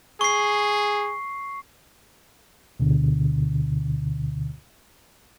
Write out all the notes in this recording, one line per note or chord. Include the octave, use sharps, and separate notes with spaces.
G#4 C#6 C7
D2 B2 D3